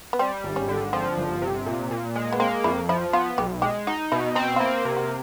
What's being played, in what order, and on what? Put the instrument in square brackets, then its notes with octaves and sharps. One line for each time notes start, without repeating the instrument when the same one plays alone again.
[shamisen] B3
[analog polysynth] G3 [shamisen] C4
[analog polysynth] G#1
[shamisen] C#4
[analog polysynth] D3
[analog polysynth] F3 [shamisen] C4
[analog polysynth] G1
C3
A#2
A#2
G#3
[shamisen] B3
[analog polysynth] A#3 [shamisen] C4
[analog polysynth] F2 [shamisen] E4
[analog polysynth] F3 [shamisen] E4
[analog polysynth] B3 [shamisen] F4
[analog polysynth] B1 [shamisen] G4
[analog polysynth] G#3 [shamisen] G4
[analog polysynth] D#4 [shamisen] F#4
[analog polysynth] B2 [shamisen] E4
[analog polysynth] C4 [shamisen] D#4
[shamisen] F4
[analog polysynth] A#3 [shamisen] E4
[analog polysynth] C3
[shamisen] F#4